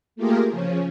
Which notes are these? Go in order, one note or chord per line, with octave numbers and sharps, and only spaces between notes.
A3 A#3 F4 G4 G#4 A#4
C#3 F3 C#4